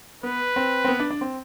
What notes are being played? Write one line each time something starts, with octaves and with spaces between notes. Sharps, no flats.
B3 B4
C4
C4
B3
D4
D4
C4